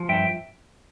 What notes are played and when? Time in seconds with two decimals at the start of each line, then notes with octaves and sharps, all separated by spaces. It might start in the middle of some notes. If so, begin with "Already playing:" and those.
Already playing: F3
0.09 G2 E5 G5